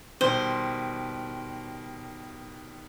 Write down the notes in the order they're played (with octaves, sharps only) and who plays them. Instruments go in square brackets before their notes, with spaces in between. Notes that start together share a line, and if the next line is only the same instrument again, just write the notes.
[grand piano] B2 D#3 G3 [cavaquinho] C5